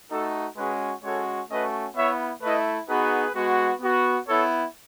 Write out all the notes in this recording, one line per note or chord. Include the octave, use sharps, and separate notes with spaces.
A3 D#4 F#4 A4
G#3 C#4 F#4 G#4 B4
G#3 C#4 F#4 A4 C#5
A3 C#4 F#4 B4 D#5
B3 E4 C#5 E5
A3 E4 B4 D#5
B3 D#4 F#4 G#4 B4
G#3 B3 F#4
B3 F#4
B3 E4 A4 C#5